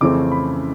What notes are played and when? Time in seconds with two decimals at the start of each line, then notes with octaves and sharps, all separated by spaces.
0.01 F2 C#3 E3 A3 C4 D6
0.32 B5